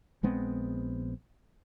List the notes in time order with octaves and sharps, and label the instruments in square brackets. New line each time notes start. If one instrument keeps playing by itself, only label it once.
[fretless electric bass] A#1 G#3 B3 C4